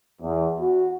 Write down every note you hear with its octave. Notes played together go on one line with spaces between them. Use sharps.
E2
F#4